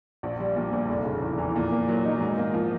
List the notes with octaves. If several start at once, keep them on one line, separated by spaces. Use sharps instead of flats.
A#1
G3
A#2
A#1
F1
C#3
E2
E3
A#2
A#3
F#3
D#4
G#2
A#3
F3